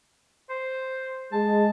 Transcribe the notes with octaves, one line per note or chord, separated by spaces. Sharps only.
C5
G#3 A5